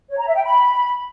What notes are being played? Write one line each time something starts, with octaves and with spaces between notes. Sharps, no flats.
C#5
A#5
E5
G5
B5